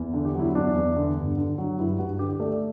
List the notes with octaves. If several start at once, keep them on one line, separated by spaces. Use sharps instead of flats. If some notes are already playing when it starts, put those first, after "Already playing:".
Already playing: E2
D3
G4
F#3 E4
E2 D4
E2
D3
G2
D3
F#3
G2 E4
G2 F#4
D3 G4
A3 D5